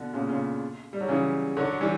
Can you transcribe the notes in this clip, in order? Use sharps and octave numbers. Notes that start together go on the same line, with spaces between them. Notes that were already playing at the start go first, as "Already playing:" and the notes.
Already playing: B2 D3
A#2 C#3
A#2 C#3
G3
F#3
C#3 E3
D3 F#3
E3 G3